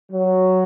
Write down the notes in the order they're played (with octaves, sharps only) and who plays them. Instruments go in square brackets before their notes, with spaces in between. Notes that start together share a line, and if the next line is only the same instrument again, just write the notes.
[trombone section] F#3